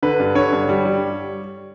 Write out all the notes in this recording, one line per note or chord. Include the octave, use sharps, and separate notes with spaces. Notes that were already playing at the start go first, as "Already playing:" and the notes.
D3 B4
G2
D3 C#5
G2
G3
G3